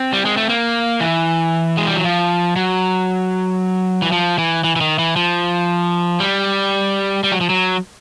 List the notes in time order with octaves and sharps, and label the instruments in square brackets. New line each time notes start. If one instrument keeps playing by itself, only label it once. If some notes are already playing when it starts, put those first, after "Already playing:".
Already playing: [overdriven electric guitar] C4
G3
G#3
A3
A#3
E3
G#3
G3
F#3
F3
F#3
E3
F3
E3
E3
E3
D#3
E3
F3
G3
G3
F#3
F3
F#3